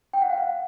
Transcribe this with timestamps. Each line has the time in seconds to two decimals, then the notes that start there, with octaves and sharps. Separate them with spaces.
0.13 G5
0.22 F#5
0.30 F5
0.38 F#5